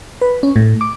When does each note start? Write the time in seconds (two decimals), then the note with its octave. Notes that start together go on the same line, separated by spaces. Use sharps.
0.21 B4
0.43 C#4
0.56 A2
0.81 D6